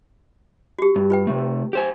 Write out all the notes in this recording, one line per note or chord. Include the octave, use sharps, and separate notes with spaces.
F#4 G4
G2
F4 B4 G5
C3 A3
G4 C5 G#5